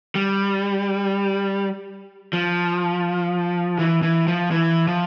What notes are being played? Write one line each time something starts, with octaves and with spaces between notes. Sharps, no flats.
G3
F3
E3
E3
F3
E3
F3